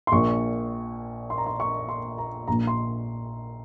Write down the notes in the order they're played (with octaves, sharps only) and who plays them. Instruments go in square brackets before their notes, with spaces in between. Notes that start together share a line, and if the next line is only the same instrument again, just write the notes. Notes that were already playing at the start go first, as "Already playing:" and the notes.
[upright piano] C6
A#1 A#2 C#6
C6
A#5
C6
C#6
C6
A#5
A#1 A#2 A#5
C6